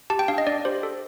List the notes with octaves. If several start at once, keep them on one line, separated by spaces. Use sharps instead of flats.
G4 A5
G5
D4 F5
D#5
D4 D5
G4 C5
A4